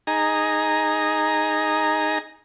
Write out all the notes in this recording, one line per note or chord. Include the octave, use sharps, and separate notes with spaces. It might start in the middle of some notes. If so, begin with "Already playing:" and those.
D#4 G#4 A#5